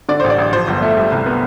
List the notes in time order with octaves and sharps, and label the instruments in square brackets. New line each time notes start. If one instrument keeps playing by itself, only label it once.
[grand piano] D3 D5
A1 C5
D5
A1
F3 C5
G1
A3
G3
C2
B3